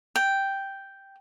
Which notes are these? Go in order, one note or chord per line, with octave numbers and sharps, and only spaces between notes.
G5